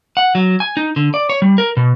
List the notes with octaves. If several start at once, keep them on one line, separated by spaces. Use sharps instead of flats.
F#5
F#3
G#5
D#4
D3
D5
C#5
G3
A#4
B2